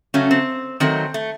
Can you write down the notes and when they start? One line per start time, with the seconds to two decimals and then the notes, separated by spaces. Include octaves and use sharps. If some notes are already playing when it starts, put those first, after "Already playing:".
0.14 C#3 F#3 A3 C#4
0.31 C4
0.80 D#3 F#3 A3 C4
1.14 A3